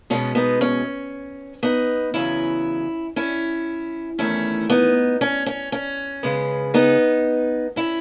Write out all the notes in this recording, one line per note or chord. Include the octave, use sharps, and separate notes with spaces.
B2 G#3 B3 C#4
B3 D#4
C#4
B3 D#4
E2 C#3 F#3 B3 C#4 E4
C#4 E4
E2 D#3 A3 C#4 E4
B3 D#4
C#4
C#4
C#4
C#3 G#3 B3
B3 D#4
C#4 E4